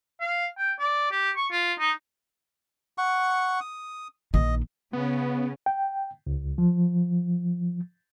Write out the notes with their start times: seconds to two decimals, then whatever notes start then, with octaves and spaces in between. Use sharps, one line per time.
0.20 F5
0.58 G5
0.79 D5
1.11 G4
1.36 C#6
1.52 F4
1.79 D#4
2.98 F#5 C#6
3.60 D#6
4.34 A#1 D#3 D#5
4.93 C#3 B3 C#4
5.66 G5
6.27 C#2
6.58 F3